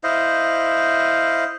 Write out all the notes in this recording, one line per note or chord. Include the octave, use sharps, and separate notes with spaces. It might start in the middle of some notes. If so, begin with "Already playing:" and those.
E4 C5 D#5 F5